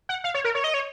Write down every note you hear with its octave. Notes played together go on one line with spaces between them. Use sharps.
F#5
F5
C#5
A#4
C#5
D#5
C#5